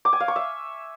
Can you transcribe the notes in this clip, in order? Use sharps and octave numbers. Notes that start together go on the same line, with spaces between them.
D6
G#5
F5
C#6
E5